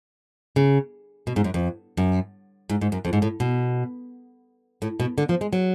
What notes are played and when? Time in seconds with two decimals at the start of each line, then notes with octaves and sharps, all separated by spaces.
0.56 C#3
1.27 B2
1.36 G#2
1.44 F#2
1.54 F2
1.97 F#2
2.69 G#2
2.81 G#2
2.92 F#2
3.05 F2
3.13 G#2
3.22 A2
3.40 B2
4.82 A2
5.00 B2
5.18 D3
5.29 F3
5.41 G#3
5.53 F#3